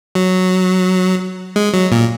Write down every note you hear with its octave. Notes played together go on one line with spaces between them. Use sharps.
F#3
G#3
F#3
A#2